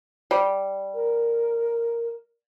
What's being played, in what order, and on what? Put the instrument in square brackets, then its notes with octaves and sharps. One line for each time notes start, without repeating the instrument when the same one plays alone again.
[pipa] G3
[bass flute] A#4